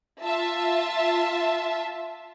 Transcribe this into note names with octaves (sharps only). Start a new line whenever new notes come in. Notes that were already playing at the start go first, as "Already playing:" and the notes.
F4 E5 A5